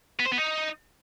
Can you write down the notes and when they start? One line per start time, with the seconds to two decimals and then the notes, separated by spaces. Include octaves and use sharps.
0.20 B3
0.26 C5
0.32 B3
0.38 D#4